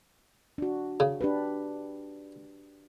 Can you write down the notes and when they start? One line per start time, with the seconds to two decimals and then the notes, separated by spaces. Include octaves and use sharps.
0.58 D4 F#4
1.00 C#3
1.21 D4 G4 B4